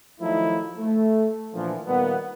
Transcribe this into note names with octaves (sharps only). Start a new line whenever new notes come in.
D#3 F3 F#3 A3 D#4 E4
A3
A#2 D3 E3 F3
A#2 D#3 G3 A#3 B3